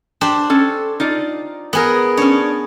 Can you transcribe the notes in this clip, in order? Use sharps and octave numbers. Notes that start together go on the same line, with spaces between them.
D4 G4 C5
C#4 A4
D#4 F4 D5
B3 G#4 A#4
C#4 D4 C#5